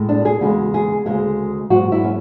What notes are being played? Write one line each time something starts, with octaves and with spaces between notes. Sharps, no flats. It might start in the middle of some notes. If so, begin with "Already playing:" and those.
Already playing: A2 G#3
D4
G#4
E2 C#3 G#3 F#4
G#4
D2 C#3 G#3 G#4
G#2 F#3 F#4
E4
C#4